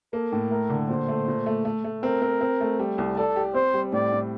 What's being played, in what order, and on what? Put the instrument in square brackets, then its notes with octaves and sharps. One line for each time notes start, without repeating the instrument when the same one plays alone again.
[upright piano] A#3 [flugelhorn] A4
[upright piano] A2
[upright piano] A3 [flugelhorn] A#4
[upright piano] D3
[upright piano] A#2 [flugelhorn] C5
[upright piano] A3
A#2
A3
A3
A3
[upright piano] C4 [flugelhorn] A#4
[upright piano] C4
C4
A3
G3
C2
[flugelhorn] A4 [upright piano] D5
[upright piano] G4
[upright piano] C4 [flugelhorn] C5
[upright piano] G3
[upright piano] A2 [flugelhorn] D5
[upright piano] A2